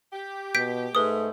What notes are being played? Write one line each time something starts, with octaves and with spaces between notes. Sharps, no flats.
G4
B2 G6 B6 D7
G#2 A3 B4 D#6